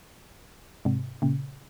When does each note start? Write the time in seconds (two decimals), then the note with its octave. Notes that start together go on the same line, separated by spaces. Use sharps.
0.85 G#2 C3
1.22 A#2 C#3